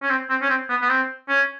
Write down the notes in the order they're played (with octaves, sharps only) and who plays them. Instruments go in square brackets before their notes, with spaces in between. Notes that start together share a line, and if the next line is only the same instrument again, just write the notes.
[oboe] C#4
C4
C4
C#4
C4
B3
B3
C4
C#4